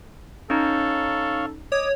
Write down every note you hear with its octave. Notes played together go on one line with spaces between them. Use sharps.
C#4 D#4 A4 C#5 F5
C#5 D#5 D6